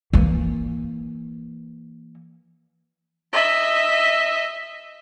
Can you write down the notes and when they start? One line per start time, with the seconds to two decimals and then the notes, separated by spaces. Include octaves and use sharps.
0.13 E3 A#3
3.33 D#5 E5